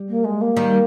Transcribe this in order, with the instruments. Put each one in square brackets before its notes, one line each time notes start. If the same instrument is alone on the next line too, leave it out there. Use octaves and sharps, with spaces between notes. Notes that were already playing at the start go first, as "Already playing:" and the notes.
Already playing: [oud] G3
[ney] A#3
G#3
A#3
[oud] D#3 G3